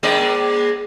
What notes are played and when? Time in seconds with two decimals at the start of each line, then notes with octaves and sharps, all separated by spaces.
0.03 G#3 A#3 D5